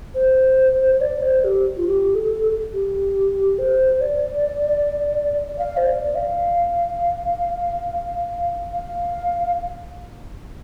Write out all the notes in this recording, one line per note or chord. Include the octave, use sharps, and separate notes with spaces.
C5
C5
D5
C5
G4
F4
G4
A4
G4
C5
D5
D5
F5
C5
D5
D5
F5
F5